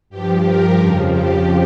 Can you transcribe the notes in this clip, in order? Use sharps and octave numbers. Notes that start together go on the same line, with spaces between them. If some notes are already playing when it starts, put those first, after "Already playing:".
G2 F3 G4
G4 A#4
F2 C#3 F3
G4